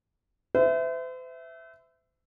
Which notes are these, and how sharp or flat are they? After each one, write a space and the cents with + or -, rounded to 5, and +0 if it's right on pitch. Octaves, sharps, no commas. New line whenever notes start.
C5 -45 E5 +0